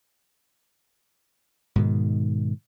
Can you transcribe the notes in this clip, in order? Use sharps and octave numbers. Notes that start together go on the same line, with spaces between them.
G#2 B2 D#3